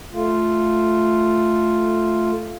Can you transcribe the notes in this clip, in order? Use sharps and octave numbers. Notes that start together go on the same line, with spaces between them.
A3 F4